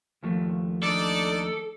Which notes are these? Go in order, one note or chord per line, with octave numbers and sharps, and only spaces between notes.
D#2 F3 A3
D4 D#4 A4 D5